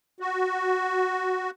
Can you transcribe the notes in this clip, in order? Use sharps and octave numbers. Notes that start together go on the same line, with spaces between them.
F#4